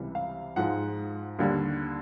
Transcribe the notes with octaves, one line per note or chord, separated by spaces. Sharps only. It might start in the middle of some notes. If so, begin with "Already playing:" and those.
Already playing: C#2 C3 E3 G3
F5
G#2 F3 G#3 F#5
D#2 D3 G3